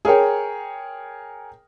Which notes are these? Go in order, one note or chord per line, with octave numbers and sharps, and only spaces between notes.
G#4 A#4 C#5 G5